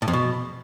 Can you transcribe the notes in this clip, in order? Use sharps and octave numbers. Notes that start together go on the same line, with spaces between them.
A2
F2
B2